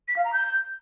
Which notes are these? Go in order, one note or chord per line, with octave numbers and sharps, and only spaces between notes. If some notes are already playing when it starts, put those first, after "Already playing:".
B6
F5
A#5
G6